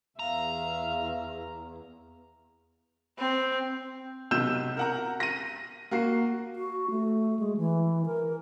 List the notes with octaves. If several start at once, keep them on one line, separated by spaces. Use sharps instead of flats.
E2 E5 F5 A#5
C4
B1 C3 E6 G6 E7
A#4 F#5 A#5
A#6 D#7
A#3 F#4 C7
F#4
A3
G#3
E3
A#4